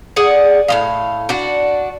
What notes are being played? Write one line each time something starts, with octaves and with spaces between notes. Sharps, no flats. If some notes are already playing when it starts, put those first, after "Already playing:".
G#4 D5 F#5
A2 G#3 F5
D4 F#4